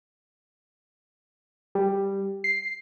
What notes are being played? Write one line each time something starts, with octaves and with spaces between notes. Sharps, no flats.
G3
C7